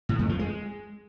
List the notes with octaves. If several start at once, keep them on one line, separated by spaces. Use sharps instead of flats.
A2
F2
F3
G#3